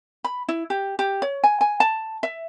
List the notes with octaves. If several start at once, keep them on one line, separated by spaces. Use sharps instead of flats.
B5
E4
G4
G4
C#5
G#5
G#5
A5
E5